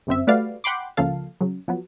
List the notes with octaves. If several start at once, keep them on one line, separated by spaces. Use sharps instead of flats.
G1 F#2 C4 E5
G3 A3 F#4 B4 D5 F5
F#5 G5 B5 C6 D6
C#2 C#3 F3 A#3 A4 F5
C#3 F#3
F3 F#3 B3